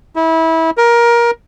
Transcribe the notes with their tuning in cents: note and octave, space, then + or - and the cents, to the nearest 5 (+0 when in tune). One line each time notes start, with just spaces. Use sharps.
E4 -25
A#4 +20